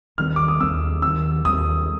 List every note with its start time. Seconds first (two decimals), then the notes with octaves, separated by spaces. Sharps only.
0.18 D#2 D#3 G3 C4 F6
0.36 D6
0.48 D#6
0.60 D#2 D#3 G3 C4 E6
1.02 D#2 D#3 G3 C4 E6
1.45 D#2 D#3 G3 C4 D#6